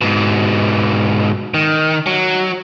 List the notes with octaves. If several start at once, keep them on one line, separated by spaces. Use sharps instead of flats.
G#2 B2
D#3
F#3